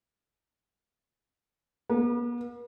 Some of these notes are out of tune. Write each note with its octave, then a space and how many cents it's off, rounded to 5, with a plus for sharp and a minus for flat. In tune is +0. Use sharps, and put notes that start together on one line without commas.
B3 -45